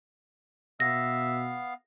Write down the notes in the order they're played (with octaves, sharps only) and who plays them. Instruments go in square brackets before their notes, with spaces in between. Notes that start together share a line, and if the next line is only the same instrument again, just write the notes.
[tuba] B2 [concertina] B3 F5 [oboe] E5 [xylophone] A#6